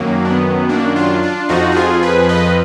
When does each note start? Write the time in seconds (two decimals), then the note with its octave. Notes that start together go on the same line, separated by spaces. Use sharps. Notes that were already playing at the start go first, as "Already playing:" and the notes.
Already playing: F#2 D#3 F#3 A#3
0.25 D4
0.30 B3
0.69 A#3 D4
0.96 D4 F4
1.23 D4 F4
1.49 F2 F3 D#4 F#4
1.72 F#4
1.76 F4 G#4
2.02 G#4 B4
2.29 B4 D#5